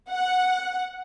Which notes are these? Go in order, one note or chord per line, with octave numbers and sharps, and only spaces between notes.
F#5